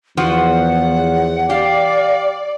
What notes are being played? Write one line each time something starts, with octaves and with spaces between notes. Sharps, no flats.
E2 F3 F#4 F#5
G4 D5 F5